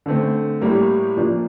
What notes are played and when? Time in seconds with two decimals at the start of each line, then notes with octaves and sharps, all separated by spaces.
0.06 D3 A3 C4
0.61 A2 G3 A#3
1.17 A#2 F3 A#3 D4